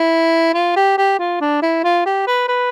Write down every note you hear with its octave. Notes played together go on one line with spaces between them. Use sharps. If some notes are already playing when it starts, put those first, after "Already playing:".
Already playing: E4
F4
G4
G4
F4
D4
E4
F4
G4
B4
B4